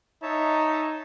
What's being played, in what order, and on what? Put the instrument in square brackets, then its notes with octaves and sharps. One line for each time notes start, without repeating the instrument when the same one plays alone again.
[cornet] D#4 [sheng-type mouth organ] C#5 E5 A5